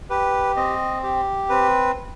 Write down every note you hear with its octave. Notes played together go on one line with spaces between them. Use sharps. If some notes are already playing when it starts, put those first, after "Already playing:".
G4 B4
C4 D#5
G4
C4 B4